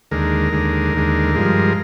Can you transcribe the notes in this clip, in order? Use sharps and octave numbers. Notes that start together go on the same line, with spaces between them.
D#2 D3 G#3 A#4
D#2 D3 G#3
D#2 D3 G#3
G2 F3 G#3